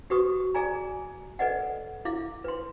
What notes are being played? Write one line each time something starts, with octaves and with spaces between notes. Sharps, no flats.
F#4 G4 B4 C#6 D#6
G#4 D5 G#5 A#5
A4 B4 D5 D#5 F#5
E4 F5 D6
B4 C6